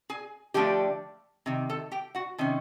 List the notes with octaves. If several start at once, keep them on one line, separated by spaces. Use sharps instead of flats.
G#4 G#5
D3 F3 A3 D4 G4 G5
C3 D#3
A4 A5
G4 G5
F#4 F#5
C3 D#3 C#4